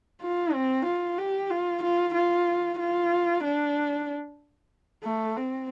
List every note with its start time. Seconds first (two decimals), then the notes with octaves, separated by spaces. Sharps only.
0.22 F4
0.53 C4
0.85 F4
1.18 G4
1.50 F4
1.83 F4
2.14 F4
2.79 F4
3.43 D4
5.04 A3
5.36 C4